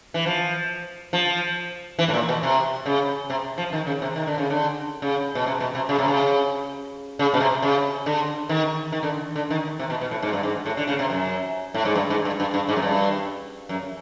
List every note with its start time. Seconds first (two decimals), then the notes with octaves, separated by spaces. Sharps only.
0.14 E3
0.26 F3
1.13 F3
1.99 E3
2.08 A2
2.14 A#2
2.29 B2
2.43 C3
2.86 C#3
3.30 C3
3.58 F3
3.73 D#3
3.87 C#3
4.02 C3
4.16 D#3
4.27 D3
4.38 C#3
4.50 D3
5.02 C#3
5.35 B2
5.46 C3
5.60 B2
5.75 C3
5.89 C#3
5.99 C3
6.08 C#3
7.19 C#3
7.34 B2
7.40 C3
7.62 C#3
8.06 D3
8.49 D#3
8.92 D#3
9.03 D3
9.36 D3
9.50 D#3
9.79 C3
9.90 B2
10.01 B2
10.11 A2
10.22 G#2
10.33 G2
10.43 G#2
10.66 A2
10.77 D3
10.87 C#3
10.99 C3
11.10 F#2
11.74 A2
11.85 G#2
11.95 G2
12.10 G#2
12.25 G2
12.40 G2
12.54 G2
12.69 G#2
12.76 F#2
12.82 G2
13.69 F#2